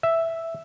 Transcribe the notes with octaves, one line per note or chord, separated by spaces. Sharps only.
E5